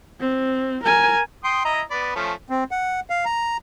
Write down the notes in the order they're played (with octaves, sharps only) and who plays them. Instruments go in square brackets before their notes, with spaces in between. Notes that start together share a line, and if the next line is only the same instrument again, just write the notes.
[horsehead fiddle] C4
A#4 G#5
[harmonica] G5 C6 D#6
E4 D#5 A#5
B3 D5 B5
F3 A3 C#4
[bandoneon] C4
F#5
F5
A#5